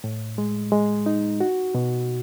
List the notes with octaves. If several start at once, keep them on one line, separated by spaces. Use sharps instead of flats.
A2
G#3
G#3
D#4
F#4
B2